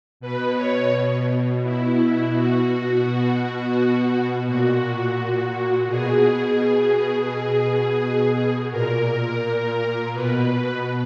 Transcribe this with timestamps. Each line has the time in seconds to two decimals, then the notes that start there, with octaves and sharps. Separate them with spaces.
0.20 B2 B4
0.56 C#5
1.62 B2 E4
2.34 F#4
3.05 B2
4.46 A#2 F#4
5.88 B2 G#4
7.29 B2
8.70 A#2 A#4
10.12 B2 B4